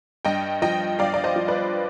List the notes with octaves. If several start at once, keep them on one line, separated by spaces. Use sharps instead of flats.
G2 D#5 G5
F3 D#5 G5
G2 D5 F5
D5
C5 D#5
F3
B4 D5